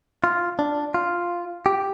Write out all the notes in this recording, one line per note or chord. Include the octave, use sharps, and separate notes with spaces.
F4
D4
F4
G4